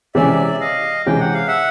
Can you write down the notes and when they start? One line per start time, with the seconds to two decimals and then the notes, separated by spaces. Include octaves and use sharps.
0.15 C3 E3 G#3 C#4 D5 E5
0.60 D#5 F5
1.06 C3 E3 G#3 C#4 G5
1.20 F#5
1.34 F5
1.47 E5 F#5